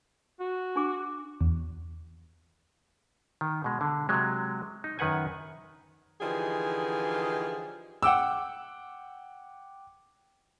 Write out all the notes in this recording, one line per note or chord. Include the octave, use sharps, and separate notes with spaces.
F#4
D4 G#4 D6
E2
D#3
B2 G#3
D3
C3 F#3 G#3
D#4
F#2 D#3 B4 F#5 G#5
D3 E3 F3 D#4 G4 G#4
F#5 G5 D6 E6